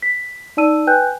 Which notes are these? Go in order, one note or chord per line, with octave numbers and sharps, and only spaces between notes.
B6
D#4 D5 A5 E6 D#7
B4 G5 G#5 F#6 G6